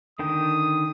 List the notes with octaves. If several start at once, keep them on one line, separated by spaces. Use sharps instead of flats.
D3 D#3 G5 D#6